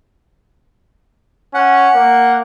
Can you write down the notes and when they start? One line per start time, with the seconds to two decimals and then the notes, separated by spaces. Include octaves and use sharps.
1.54 C#4 F#5
1.95 A#3